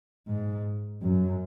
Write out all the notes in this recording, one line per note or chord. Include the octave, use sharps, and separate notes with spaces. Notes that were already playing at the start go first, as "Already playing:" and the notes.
G#2
F#2